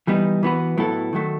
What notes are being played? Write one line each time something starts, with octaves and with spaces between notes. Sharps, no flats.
E3 G3 B3 D#4
E3 B3 F#4 B4
A2 F#3 B3 E4 A4
D#3 F#3 A3